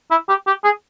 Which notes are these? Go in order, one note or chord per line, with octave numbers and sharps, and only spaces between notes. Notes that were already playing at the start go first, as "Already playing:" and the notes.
E4
G4
G4
G#4